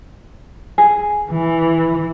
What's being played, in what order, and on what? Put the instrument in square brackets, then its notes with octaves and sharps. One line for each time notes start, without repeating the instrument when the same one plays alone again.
[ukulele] G#4
[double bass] E3